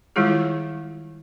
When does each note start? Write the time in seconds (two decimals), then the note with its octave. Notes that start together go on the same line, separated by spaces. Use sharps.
0.16 D#3 G3 G#3 E4 F4 G#4